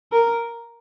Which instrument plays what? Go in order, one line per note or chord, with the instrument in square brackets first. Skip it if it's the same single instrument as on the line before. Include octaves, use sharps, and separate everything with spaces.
[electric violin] A#4